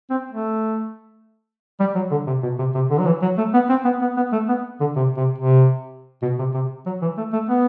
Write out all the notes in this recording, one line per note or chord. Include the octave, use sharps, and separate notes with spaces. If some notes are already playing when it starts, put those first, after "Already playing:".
C4
A3
G3
F#3
D3
C3
B2
C3
C3
D3
F#3
E3
F#3
A3
B3
C4
B3
B3
B3
A3
B3
D3
C3
C3
C3
B2
C3
C3
F#3
E3
A3
A3
B3